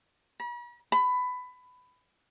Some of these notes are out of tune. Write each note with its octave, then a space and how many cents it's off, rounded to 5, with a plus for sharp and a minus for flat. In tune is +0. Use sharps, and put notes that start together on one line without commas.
B5 -45
B5 +15